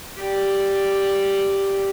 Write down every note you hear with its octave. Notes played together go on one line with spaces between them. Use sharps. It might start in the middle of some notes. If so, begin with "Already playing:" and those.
G4 D5